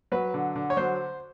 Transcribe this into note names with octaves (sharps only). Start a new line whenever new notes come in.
F#3 B4
D3
D3
C#5
F#3 C5